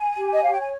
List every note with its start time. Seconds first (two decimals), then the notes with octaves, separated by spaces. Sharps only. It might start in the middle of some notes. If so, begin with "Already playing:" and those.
Already playing: G#5
0.16 G4
0.33 D#5
0.43 C#5 F5
0.51 G5
0.60 G#5